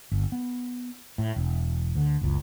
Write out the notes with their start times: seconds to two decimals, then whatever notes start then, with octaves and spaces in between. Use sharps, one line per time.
0.12 G1
0.32 B3
1.18 A2
1.36 E1
1.95 D2 D3
2.21 F#1 C#2